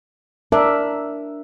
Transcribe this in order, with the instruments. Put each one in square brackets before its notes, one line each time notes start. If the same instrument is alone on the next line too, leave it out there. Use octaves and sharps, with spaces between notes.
[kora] D4 [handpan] A#4 E5